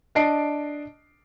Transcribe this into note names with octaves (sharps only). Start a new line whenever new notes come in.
D4 D#5 A5 C7 D7